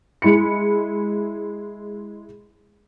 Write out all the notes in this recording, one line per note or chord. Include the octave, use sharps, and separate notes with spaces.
G#3 E4 B5 C#7